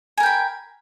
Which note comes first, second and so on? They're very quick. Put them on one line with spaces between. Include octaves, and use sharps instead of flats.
G#5 A#4 G5 B5